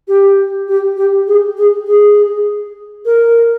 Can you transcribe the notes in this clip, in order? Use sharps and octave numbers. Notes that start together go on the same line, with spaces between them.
G4
G4
G4
G#4
G#4
G#4
A#4